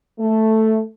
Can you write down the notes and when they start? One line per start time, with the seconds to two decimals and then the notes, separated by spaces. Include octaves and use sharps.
0.19 A3